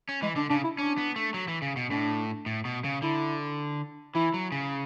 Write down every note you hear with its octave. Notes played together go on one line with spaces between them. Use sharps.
C#4
E3 G#3
D3 D4
C#3 D4
E4
C#4 D4
B3
A3
F#3
E3
C#3
B2
A2 D4
A2
B2
C#3
D3 E4
E3 E4
F#3
C#3